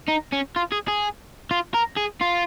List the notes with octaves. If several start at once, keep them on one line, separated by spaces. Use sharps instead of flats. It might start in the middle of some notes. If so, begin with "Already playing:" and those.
D#4
C#4
F4
G#4
G#4
F4
A#4
G#4
F4